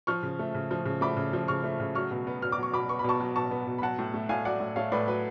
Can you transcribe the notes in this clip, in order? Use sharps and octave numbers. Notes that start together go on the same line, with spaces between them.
F3 C#6 F6
C#3
A3
C#3
F3
C#3
A3 B5 D6
C#3
F3
C#3 C#6 F6
A3
C#3
F#3 C#6 F6
B2
B3
B2 F6
D6
F#3 C#6
B2 B5 D6
B3 C#6
B5
B2 A5 C#6
F#3
B2 A5 C#6
B3
B2
B5
F#3 F#5 A5
A2
A3
A2 F5 G#5
F#3 D5 F#5
A2
A3 C#5 F5
A2 B4 D5
F#3 B4